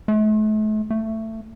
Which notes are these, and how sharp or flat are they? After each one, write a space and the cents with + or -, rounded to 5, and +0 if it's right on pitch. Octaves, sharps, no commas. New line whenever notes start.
A3 -40
A3 +15